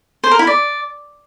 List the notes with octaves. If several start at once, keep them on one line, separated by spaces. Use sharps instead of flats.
C5
A#4
E4
D5